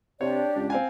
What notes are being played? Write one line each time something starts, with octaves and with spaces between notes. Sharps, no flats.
C3 D4 G4 C#5 D5
C#2
C4 F5 G#5